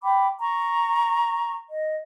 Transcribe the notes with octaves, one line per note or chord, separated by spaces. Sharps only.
G5 B5 D6
A#5 C#6
D#5